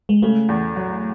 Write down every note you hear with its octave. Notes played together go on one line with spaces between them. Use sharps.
G#3
C#3 A3
E2
F#3